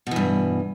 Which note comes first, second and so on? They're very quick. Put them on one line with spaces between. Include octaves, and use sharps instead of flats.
B2 E3 G2